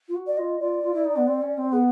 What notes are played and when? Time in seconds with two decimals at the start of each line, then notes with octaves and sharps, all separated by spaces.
0.08 F4
0.15 F#4
0.27 D5
0.37 F4 D#5
0.60 F4 D5
0.83 F4
0.93 E4
1.05 D#4
1.16 B3
1.27 C4
1.42 C#4
1.57 C4
1.72 B3 G#4